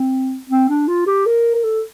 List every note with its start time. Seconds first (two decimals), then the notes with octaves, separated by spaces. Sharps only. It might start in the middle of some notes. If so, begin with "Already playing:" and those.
Already playing: C4
0.49 C4
0.69 D4
0.88 F4
1.06 G4
1.26 A#4
1.55 A#4
1.64 A4